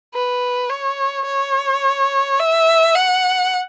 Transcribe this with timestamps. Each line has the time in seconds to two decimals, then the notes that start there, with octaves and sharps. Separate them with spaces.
0.14 B4
0.70 C#5
1.26 C#5
2.40 E5
2.95 F#5